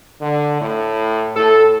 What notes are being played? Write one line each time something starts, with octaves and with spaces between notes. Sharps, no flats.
D3
A2
A2 A4